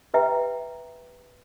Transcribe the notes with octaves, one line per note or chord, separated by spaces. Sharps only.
G4 B4 E5 G5 A#5